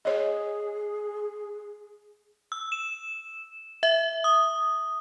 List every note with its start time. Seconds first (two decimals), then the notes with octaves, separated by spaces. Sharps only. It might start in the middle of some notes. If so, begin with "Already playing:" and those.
0.05 G#4 C#5 D#5
2.52 E6
2.72 E7
3.83 E5
4.24 D#6